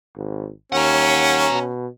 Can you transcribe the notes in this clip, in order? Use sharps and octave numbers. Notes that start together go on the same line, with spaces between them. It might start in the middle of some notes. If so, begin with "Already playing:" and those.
G#1
D#2 C#4 F#5 A#5
B2